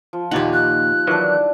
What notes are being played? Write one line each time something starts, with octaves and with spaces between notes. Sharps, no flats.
F3
D#2 A#2 D#4 G4 F#5
F#6
D#3 E3 F#3 D4 E4